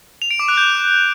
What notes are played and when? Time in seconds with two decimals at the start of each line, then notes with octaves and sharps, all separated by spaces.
0.22 F7
0.31 D7
0.39 D6
0.48 F#6
0.57 G6